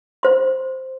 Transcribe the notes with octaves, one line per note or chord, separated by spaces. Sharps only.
C5 C6